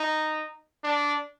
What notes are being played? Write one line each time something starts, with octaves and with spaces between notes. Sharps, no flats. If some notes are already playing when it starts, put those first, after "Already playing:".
Already playing: D#4
D4